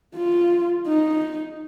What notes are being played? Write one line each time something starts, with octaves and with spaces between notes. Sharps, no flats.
F4
D#4